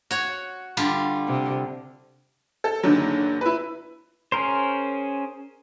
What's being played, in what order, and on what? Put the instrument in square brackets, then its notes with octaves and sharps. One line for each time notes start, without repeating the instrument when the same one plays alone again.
[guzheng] F#4 C#5
D3 G3 F4
[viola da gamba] C3
[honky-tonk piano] A4
F#1 D3 D#3 F#3
E4 B4
[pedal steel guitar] C#4 G#4 A#4 C5